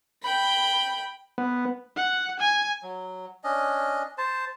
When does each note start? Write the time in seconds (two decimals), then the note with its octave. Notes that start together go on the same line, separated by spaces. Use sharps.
0.23 G5 B5
1.38 B3
1.96 F#5
2.40 G#5
2.82 F#3
3.44 C#4 D4 D#5
4.18 C5 A5